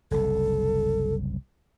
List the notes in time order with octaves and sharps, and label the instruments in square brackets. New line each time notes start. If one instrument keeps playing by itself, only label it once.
[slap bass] F#1 C2 [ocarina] A4